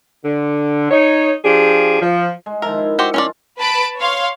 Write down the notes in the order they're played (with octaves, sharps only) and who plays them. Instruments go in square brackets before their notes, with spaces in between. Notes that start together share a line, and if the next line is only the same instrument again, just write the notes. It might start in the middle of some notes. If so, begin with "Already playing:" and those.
[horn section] D3
D#4 C#5
F3 D4 G4 G#4
F3
[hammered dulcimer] G#3
[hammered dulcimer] D#3 F3 E5 [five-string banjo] A#4
[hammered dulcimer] E4
[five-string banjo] F#4 G4 C5
[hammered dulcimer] F3 F4 [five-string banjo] C#4 C#5 D5
[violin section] B4 A5 B5 D7
C#5 F5 C6